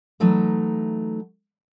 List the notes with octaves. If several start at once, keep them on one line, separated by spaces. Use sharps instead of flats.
E3 F#3 A3 D#4